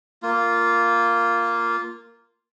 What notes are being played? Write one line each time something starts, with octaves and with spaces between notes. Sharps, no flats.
A#3 F4